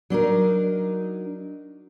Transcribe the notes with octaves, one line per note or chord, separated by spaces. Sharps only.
F#3 D4 D#4 A#4